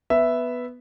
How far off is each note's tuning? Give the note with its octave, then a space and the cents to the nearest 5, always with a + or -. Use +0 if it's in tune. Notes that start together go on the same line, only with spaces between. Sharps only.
B3 +0 E5 +0